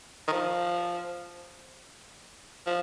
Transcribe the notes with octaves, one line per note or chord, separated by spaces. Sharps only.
D#3
F3
F3